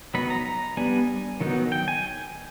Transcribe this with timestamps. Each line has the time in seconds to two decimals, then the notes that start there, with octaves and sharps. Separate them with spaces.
0.14 F#3 B3 D#4 B5
0.30 A#5
0.46 A#5
0.77 G3 B3 D4 G#5
1.40 D#3 F#3 B3 D#4
1.72 G5
1.88 G#5